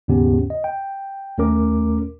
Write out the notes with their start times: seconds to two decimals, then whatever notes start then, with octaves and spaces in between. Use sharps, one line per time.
0.08 D#2 G#2 C#3 B3 C#4 G4
0.50 D#5
0.64 G5
1.38 D#2 A3 C#4 A#4 D6